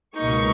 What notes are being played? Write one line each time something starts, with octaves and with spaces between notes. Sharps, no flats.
C#2 B2 A#3 D#4 C#6